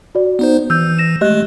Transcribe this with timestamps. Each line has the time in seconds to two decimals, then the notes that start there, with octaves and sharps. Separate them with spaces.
0.15 F#4 D5
0.39 B3 D#4 C5
0.70 E3 E6 G6
0.98 A#6 E7
1.21 G#3 A3 G4 D#5 F#6